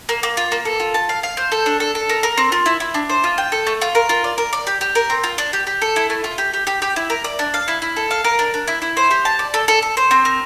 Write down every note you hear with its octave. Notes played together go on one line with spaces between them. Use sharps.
A#3
A#3
F4
A#3
A4
F4
A5
F5
F5
C5
A4
D4
A4
A4
A#4
A#4
C4
F4
E4
E4
D4
C5
F4
G5
A4
A3
F4
A#4
F4
D5
A#4
D5
G4
G4
A#4
C4
F4
D4
G4
G4
A4
E4
A3
F4
G4
G4
G4
G4
E4
A#4
D5
D4
F5
E4
E4
A4
F5
A#4
D4
D4
E4
E4
C5
G4
A5
D5
A4
A4
A4
C5
C4
A#4